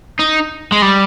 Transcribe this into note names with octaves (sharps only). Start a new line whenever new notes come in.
D#4
G#3
G3